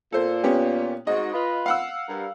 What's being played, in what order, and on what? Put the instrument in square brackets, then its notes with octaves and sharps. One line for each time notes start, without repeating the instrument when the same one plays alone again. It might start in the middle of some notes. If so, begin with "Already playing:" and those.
[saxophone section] A#2 [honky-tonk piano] A4 C5
[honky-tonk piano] B3 C#4 G4
[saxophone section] G#2 F#4 [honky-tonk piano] D#5
[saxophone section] F4 B4
[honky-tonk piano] F5 F#5 E6
[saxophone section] G2 G3 A#4